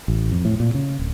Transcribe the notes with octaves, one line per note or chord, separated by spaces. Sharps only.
A1
F2
A2
A#2
C#3
D1